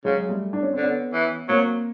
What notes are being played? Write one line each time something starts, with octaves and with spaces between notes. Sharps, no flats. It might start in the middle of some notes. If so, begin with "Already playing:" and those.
C#3 F#3 G#3
G3 A3
D4
C#4
D3 C4
B3 C#4
E3
F#3 A#3 C4